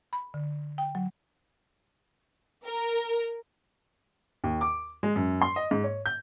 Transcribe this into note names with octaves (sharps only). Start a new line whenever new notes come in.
B5
D3
G5
F#3
A#4
D#2
D6
G#3
F#2
C6
D#5
G#2
C#5
G6